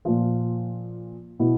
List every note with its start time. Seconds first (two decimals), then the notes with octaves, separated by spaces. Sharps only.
0.05 A#2 F3 F4
1.40 B2 E4